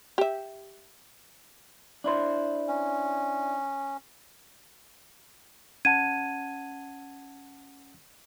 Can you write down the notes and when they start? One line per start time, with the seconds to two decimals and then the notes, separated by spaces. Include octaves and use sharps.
0.18 G4 E5
2.04 D4 E4 C5
2.68 C#4
5.85 C#4 F#5 A5 G#6 D#7